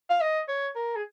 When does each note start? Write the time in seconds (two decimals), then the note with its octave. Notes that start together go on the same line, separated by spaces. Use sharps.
0.10 F5
0.21 D#5
0.49 C#5
0.76 A#4
0.96 G#4